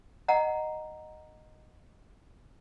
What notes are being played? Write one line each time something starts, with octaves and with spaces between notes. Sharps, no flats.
D#5 F#5 A#5